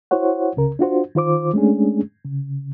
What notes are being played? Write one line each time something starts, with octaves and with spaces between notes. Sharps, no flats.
E4 F#4 C5 C#5 F#5
C#2 C#3 A#4
D4 F4 F#4 C5
D#3 F4 C5 D6
G#3 A3 C#4 D4 G#4
C#3